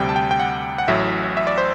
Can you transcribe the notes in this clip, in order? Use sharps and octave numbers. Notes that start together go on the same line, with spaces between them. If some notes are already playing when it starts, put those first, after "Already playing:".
Already playing: D2 C3 G3 G5
A5
G5
G5
F#5
F#5
A1 A2 F#3 E5
E5
D5
C5